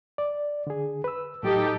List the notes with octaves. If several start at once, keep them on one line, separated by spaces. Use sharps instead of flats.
D5
D3 G#4
B4 E6
A2 F#3 D#4 G4 A4